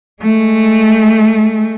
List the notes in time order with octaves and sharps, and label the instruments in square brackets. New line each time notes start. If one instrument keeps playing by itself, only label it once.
[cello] G#3 A3